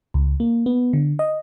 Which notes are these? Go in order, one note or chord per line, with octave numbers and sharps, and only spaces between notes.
C#2
A#3
B3
D3
D#5